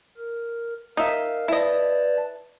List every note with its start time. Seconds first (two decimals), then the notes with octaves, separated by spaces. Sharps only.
0.18 A#4
0.97 D#4 A#4 E5 F5
1.48 E4 B4 D5 D#5 A5